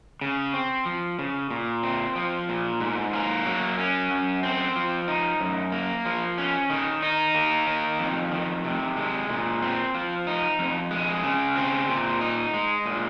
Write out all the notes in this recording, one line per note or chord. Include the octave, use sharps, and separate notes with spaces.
C#3
C4
F3
C#3
A#2
C4
F3
A#2
G#2
A#3
F#3
C#4
F#2
C4
F3
D#4
F#2
A#3
F3
C#4
D#3
D#4
A#3
D#3
F2
D#3
C3
G#3
A#2
C4
F3
D#4
F2
G#3
C#3
C4
A#2
D#4
G#3
A#2